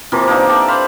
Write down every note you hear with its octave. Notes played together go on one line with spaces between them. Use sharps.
C3 E3 F3 A#3
A#3 D4 D#4
A4 D5 E5 G5
C5 F5 B5